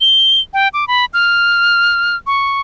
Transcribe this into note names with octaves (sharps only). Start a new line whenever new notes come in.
G7
G5
D6
B5
F6
C#6